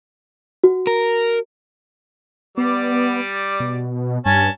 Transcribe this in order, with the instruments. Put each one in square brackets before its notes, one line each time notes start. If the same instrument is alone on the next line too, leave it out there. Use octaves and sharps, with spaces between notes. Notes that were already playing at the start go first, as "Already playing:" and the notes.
[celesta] F#4
[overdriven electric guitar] A#4
[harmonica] G3 D5 [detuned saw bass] B3
[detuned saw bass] B2
[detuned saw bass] G2 [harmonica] C#4 G#5 A5